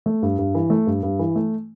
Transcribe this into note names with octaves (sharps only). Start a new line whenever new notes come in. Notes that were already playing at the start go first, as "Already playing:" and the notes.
A3
G2
G2
E3
A3
G2
G2
E3
A3